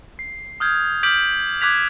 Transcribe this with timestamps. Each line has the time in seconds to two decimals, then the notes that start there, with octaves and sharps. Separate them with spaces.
0.19 C7
0.60 D#6 F6 G6 G#6
1.03 D6 F6 G6 B6 D7 F#7
1.61 D6 F#6 G#6 B6 F7